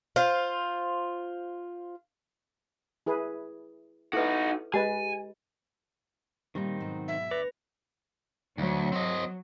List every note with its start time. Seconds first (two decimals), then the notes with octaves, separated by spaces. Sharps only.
0.16 F4 C5
3.06 E4 G#4 B4
4.13 D#4 E4 F#4 A4 B4
4.74 G#3 G4 B4 D#5 G#5
6.55 A#2 D#3 G3 C4 D#4
6.80 G#2 B2 F#3
7.08 E5
7.31 D2 B4 D5 A#6
8.58 D2 F#3
8.92 C4 D#5